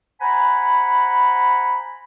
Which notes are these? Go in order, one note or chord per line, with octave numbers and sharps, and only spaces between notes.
C5 F#5 G#5 A#5 B5